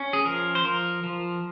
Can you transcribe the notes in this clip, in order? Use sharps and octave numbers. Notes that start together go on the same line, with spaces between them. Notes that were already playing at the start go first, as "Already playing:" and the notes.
Already playing: C#4
G#4
F3 A#4
C5
F3 A#4
F3